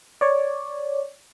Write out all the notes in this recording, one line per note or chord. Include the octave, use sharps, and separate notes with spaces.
C#5 D5